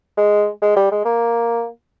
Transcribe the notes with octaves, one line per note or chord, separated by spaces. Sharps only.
G#3
G#3
G3
G#3
A#3